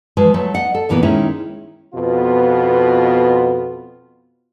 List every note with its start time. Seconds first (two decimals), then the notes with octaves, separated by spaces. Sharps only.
0.17 E3 F3 G#3
0.34 F#3 A3
0.54 D#5 F#5
0.75 A4
0.89 D2 A#2 E3 A#3 B3
1.03 D#3 G#3 C#4 E4
1.95 F2 B2 B3 F4